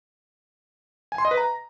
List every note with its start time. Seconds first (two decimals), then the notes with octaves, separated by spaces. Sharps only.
1.12 G#5
1.18 C6
1.25 D#5
1.31 B4
1.37 A#5